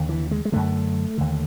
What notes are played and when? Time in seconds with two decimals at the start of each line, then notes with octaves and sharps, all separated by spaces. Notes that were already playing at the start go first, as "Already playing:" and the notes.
Already playing: D#2 D3
0.09 E3
0.31 G#3
0.45 G#3
0.52 F#2 D3 A3
1.18 D#2 D3